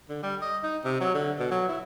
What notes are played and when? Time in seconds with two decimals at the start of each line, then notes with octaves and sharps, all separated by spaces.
0.09 D3
0.23 G3
0.41 D#5
0.63 D#4
0.84 C3
1.01 F#3
1.14 D3
1.39 B2
1.51 F#3
1.69 E4